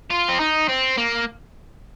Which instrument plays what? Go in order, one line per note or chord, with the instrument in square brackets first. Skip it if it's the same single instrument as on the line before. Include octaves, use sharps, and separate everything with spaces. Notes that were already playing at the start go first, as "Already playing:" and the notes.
[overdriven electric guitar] F4
C4
D#4
C4
A#3